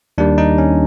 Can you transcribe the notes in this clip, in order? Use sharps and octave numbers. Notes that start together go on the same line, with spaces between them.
D#2 D#3 G3 D4
D#4
C#4